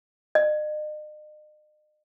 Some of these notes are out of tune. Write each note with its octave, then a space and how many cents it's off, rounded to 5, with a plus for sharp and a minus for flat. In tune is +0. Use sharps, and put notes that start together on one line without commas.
D#5 -40